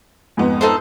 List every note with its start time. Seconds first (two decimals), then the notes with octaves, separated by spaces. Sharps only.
0.37 F2 G#2 B3
0.61 D#4 A4 C5